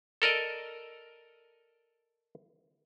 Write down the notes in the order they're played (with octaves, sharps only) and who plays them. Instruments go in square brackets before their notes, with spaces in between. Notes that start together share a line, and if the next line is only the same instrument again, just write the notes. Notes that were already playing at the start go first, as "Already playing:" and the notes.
[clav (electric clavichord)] A4 A#4 D5 D#5